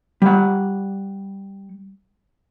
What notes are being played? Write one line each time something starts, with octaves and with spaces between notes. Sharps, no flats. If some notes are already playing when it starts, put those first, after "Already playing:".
G3 F#5